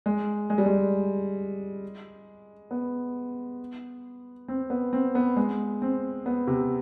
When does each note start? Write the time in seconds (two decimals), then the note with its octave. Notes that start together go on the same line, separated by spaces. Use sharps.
0.06 G#3
0.50 G#3
0.58 G3
0.66 G#3
2.71 B3
4.48 C4
4.70 B3
4.93 C4
5.15 B3
5.36 G#3
5.82 C4
6.26 B3
6.47 C3